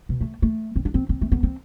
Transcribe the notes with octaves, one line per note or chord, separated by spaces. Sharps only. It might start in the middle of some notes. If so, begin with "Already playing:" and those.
B2
A3
A3
C4
D4
C4
C4
A3
B3
C4